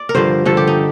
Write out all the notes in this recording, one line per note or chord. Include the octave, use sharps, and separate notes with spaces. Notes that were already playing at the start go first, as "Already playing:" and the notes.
Already playing: D5
A#4
G2 D3 F3 C5
G2 D3 F3 A4
G4
D#4